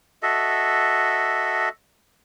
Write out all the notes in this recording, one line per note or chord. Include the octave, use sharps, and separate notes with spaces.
F#4 A4 D#5 E5